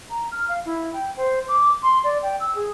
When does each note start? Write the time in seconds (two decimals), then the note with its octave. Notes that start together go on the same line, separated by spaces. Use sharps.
0.10 A#5
0.31 F6
0.49 F5
0.66 E4
0.93 G5
1.17 C5
1.48 D6
1.83 C6
2.04 D5
2.23 G5
2.40 E6
2.55 G#4